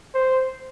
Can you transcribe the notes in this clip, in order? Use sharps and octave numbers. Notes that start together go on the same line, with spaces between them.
C5